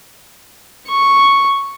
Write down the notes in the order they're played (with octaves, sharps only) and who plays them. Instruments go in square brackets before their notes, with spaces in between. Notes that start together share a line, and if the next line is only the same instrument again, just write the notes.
[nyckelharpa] C#6